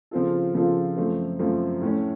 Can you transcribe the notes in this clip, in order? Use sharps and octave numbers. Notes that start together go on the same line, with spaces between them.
C#3 F3 C4 F4 A4
C#3 F3 C4 F4 A4
F#2 F3 A3 C4
F#2 F3 A3 C4
A2 A3 C#4